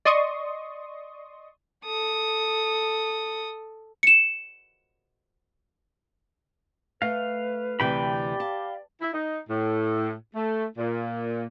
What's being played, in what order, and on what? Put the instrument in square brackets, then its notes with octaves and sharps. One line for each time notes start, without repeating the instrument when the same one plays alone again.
[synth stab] D5 D#5 C6 C#6 D#6
[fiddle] A4 D#6
[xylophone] C#7 E7
[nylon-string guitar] A3 [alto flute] B4 [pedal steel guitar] F5
[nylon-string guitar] D2 C3 E3 [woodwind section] G4 D5 [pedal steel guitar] G5 B5
[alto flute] F5 [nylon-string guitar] A5
[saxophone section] E4
D#4
A2
A3
A#2